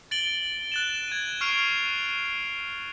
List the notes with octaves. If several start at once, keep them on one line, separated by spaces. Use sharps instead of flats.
A6 D7 F#7 G7
F#6 A6 E7
G#6 D#7
C#6 F6 C7 D7 F7